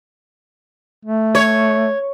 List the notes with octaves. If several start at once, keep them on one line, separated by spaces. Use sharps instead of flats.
A3
C#5